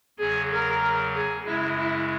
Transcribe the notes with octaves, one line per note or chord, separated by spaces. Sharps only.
E2 C#3 F#3 G#4
A#4
G#4
F#2 C#3 G#3 E4
E4